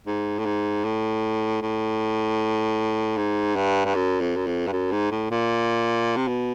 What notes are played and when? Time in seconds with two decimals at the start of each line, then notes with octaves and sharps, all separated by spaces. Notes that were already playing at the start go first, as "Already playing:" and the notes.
0.07 G#2
0.39 A2
0.45 G#2
0.84 A2
1.62 A2
3.17 G#2
3.56 G2
3.85 G2
3.95 F#2
4.21 F2
4.36 F#2
4.47 F2
4.67 G2
4.72 F#2
4.92 G#2
5.11 A2
5.31 A#2
6.16 C3
6.28 B2